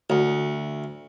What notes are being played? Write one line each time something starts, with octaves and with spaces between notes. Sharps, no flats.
D2